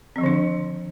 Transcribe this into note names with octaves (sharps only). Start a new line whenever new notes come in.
D3 D#3 F3 C4 D4